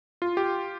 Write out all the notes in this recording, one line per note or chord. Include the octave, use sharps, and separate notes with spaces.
F4
G4